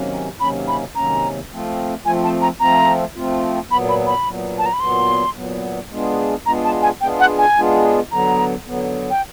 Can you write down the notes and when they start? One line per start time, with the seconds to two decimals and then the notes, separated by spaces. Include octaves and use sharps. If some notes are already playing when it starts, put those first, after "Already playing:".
Already playing: C3 D#3 F#3 A#3 C#4
0.40 C3 D#3 F#3 A#3 C#4 B5
0.68 B5
0.95 C3 D#3 F#3 A#3 C#4 A#5
1.50 F3 A3 C4 F4
2.05 F3 A3 C4 F4 G#5
2.24 A5
2.42 A#5
2.60 F3 A3 C4 F4 A#5
3.16 F3 A3 C4 F4
3.70 A#2 F#3 B3 B5
3.89 B5
4.07 B5
4.25 A#2 F#3 B3
4.58 A5
4.66 A#5
4.73 B5
4.80 A#2 F#3 B3 C6
5.36 A#2 F#3 B3
5.90 G#3 B3 D4 F4 G#4
6.45 G#3 B3 D4 F4 G#4 A#5
6.65 A5
6.82 G#5
7.00 G#3 B3 D4 F4 G#4 G5
7.20 F#5
7.38 G#5
7.57 G#3 B3 D4 F4 G#4
8.11 D3 F#3 B3 A#5
8.66 D3 F#3 B3
9.10 G5